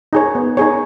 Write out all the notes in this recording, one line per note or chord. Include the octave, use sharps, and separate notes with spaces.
D#4 G#4 C#5
B3
D#4 G#4 C#5